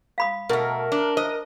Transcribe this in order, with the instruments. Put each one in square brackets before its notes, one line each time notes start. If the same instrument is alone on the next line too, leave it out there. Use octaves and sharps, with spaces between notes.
[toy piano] F5 B5 D#6
[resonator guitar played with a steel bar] B2 A3 [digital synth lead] A#4
[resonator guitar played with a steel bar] D4
[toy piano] C5 [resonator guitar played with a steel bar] D#5